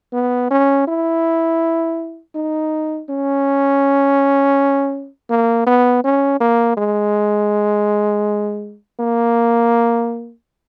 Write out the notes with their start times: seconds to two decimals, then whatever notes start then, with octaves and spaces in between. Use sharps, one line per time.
0.13 B3
0.51 C#4
0.88 E4
2.35 D#4
3.09 C#4
5.30 A#3
5.66 B3
6.04 C#4
6.40 A#3
6.77 G#3
9.00 A#3